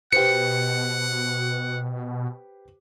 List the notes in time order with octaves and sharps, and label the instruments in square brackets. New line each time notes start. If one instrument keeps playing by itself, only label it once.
[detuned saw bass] B2 [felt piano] G4 B4 C5 [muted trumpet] F#5 [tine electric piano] C#7